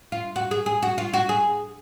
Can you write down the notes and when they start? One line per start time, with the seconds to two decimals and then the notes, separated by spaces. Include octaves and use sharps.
0.12 F4
0.36 F#4
0.51 G#4
0.66 G#4
0.83 F#4
0.98 F4
1.13 F#4
1.29 G#4